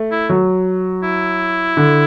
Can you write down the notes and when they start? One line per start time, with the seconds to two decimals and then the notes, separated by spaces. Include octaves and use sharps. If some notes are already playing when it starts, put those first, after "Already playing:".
Already playing: A3
0.11 E4
0.29 F#3
1.03 E4
1.77 D3